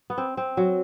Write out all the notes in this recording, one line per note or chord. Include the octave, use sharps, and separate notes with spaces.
B3
C4
C4
F#3